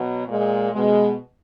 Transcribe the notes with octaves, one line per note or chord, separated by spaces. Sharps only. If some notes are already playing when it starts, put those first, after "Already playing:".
Already playing: B2 F#3
A#2 G#3
B2 G#3